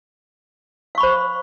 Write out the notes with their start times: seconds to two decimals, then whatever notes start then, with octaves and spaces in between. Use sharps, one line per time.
0.95 F5
0.98 C#6
1.00 B5
1.03 C5